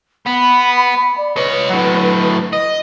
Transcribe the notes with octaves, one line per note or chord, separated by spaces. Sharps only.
B3 B5
D5
B4 C#5 D#5
A2 F#3
D#5